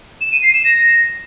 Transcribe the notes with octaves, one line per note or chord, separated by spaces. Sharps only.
E7
D#7
C7
E7
A#6